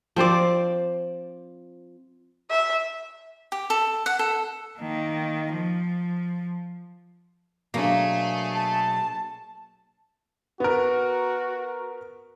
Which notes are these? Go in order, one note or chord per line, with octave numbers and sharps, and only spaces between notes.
F3 C4 C5 D5
E5
G4
A4
F#5
A4
D#3 A#3
F3
B2 F#3 A3 A#3 D4 G#4
A5
B3 F#4 A#4